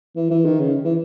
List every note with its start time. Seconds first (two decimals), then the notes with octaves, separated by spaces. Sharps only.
0.16 E3
0.31 E3
0.45 D#3
0.60 C#3
0.85 E3